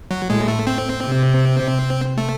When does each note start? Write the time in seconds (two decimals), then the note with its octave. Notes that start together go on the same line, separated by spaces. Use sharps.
0.11 F#3
0.30 A2 G#3
0.48 A3
0.67 C4
1.05 C3
2.18 A3